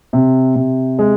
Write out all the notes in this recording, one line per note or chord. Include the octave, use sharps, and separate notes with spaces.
C3
C3
G#3